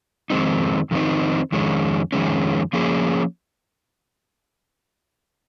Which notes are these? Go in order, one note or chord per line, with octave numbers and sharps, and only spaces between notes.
F2 D#3 G#3 C4 D#4
F2 D#3 G#3 C4 D#4
F2 D#3 G#3 C#4
F2 D#3 G#3 C#4
F3 A#3 C#4 G#4